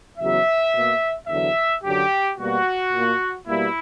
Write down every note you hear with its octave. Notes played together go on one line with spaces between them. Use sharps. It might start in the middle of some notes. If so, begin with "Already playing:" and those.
E2 C#3 F#3 B3 E5
B2 A#3
E2 D3 F#3 E5
F#2 D3 F#3 G4
B2 G3 A#3 F#4
A#2 A#3
B2 G3 A#3 E4